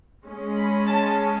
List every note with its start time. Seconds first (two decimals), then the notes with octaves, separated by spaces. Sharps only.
0.25 G#3 C#4
0.56 B5
0.86 A5